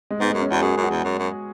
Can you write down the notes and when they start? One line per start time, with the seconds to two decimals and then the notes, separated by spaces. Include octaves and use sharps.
0.10 G#3
0.20 G#2 B3
0.30 G#3
0.34 F#2
0.41 C#4
0.50 E2 F#4
0.62 F#2 G#4
0.77 F#2
0.84 F#4
0.90 E2
1.04 F#2
1.18 F#2